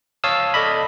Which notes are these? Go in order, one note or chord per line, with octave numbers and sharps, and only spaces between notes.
C#5 F5 A5 D#6 E6
A4 D5 D#5 B5